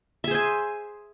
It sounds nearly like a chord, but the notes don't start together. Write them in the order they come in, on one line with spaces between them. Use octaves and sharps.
E5 G#4 C5 G#5